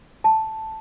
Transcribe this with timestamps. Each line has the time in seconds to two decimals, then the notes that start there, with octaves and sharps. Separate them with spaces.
0.24 A5